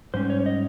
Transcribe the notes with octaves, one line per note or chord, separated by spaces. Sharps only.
G#2 G3 C#4 C5
C#5
C#5
D#5